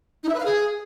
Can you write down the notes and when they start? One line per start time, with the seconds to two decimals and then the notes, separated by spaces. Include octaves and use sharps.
0.24 D#4
0.29 E5
0.34 B4
0.40 F5
0.45 G#4